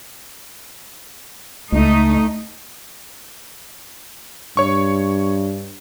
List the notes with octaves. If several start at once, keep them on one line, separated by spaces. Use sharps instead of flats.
C#2 A3 D#4
G2 C#5 C#6